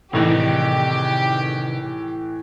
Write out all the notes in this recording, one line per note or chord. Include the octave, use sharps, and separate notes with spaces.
A2 C3 D#3 E3 D#4 G4